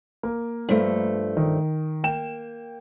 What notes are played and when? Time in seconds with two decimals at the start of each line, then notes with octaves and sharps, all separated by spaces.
0.23 A#3
0.69 G2 F3 A3
1.37 D#3
2.04 A#3 G5 E7